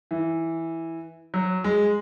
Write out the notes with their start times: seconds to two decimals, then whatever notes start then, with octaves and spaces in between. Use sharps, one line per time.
0.11 E3
1.34 F#3
1.64 G#3